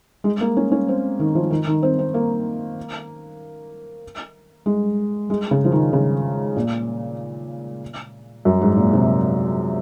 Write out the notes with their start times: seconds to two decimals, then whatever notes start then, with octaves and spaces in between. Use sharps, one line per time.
0.24 G#3
0.41 A#3
0.57 C#4
0.72 C#4
0.88 C4
1.19 D#3
1.35 F3
1.50 D#3
1.67 D#3
1.83 C4
1.99 C4
2.14 A#3
4.66 G#3
5.30 G#3
5.51 C#3
5.65 F3
5.72 D#3
5.93 C#3
6.56 A#2
8.45 F#2
8.61 G#2
8.77 A#2
8.93 C3